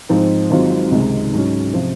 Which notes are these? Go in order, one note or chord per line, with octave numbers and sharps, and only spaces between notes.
G#2 F3 C4 D#4
G#1 G#2 F#3 C4 F4
C#2 C3 D#3 G#3 D#4
G#2 F#3 C#4
C3 F3